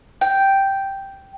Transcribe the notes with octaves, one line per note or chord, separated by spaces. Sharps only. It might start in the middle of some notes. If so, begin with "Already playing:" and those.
G5